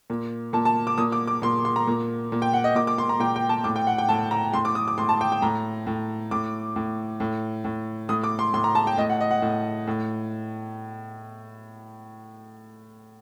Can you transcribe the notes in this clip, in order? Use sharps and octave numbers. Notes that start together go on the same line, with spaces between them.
A#2
A#2 A5
A5
D6
A#2 D#6
D6
D6
A#2 C6
C6
A#5
A#2
A#2
G5
F#5
D#5
A#2 D6
D6
C6
A#5
A#2 G5
G5
A5
A2 D6
G5
F#5
G5
A2 A5
A#5
A2 C6
D6
D#6
D6
A2 C6
A5
G5
G5
A2 A#5
A2
A2 D6
A2
A2
A2
A2 D#6
D6
C6
A2 C6
A#5
A5
G5
A2 D#5
F#5
D#5
F#5
A2
A2